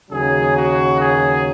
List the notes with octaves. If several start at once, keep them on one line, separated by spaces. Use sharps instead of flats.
D#2 C#3 F#3 G#4
F#4
G#4